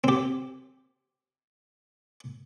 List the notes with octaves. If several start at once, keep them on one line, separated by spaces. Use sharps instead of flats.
C4 G4